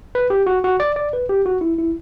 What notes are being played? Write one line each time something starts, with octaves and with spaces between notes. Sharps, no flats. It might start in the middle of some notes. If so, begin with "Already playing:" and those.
B4
G4
F#4
F#4
D5
D5
B4
G4
F#4
E4
E4